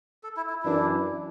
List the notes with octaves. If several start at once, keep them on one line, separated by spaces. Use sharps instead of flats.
A4
E4
E4
F#2 E3 D4 E4